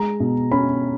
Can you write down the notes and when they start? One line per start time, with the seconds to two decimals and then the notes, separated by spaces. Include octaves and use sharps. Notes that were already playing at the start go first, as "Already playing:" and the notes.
Already playing: G#3 A#5
0.20 B2
0.52 C#4 B5